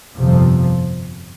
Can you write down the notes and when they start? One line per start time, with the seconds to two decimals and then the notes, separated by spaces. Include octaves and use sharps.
0.16 G1 F2 C3 F3